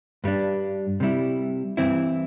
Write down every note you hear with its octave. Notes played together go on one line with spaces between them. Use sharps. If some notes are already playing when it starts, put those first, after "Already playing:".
G2 G3 D4
C3 G3 E4
G2 E3 C4 E4